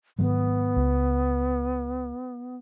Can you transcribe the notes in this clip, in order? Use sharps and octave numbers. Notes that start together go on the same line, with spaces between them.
G#2 D#3 F#3 B3
C#2